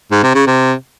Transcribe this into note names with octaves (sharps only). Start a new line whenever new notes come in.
G#2
C3
C#3
C3